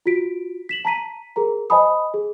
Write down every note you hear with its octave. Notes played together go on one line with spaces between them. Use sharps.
F4 F#4 B6 D7
B6 E7 F#7
A5 A#5 B6 D#7
G#4 A#4 A#5
C5 D#5 G#5 A5 B5 D#6
G#4